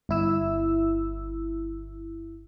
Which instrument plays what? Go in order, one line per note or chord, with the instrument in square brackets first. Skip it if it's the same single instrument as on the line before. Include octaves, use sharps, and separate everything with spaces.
[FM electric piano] G1 E4 E6